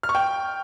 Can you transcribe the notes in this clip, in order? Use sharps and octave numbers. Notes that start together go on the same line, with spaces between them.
F6
C#6
G5